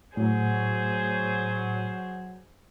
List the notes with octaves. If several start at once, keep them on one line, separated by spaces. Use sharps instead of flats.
A2 F#3 G#4 C5